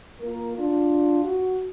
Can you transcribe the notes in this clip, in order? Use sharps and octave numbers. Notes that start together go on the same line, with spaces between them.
A#3 F4 A#4
D4 F4
F#4